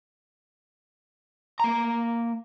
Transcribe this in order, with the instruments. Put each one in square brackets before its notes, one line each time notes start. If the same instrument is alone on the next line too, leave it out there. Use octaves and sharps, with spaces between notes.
[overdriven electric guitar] A#3 A#5